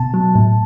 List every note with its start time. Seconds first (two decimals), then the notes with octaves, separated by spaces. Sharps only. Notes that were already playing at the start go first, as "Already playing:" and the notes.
Already playing: B2 A5
0.14 F#3
0.35 A2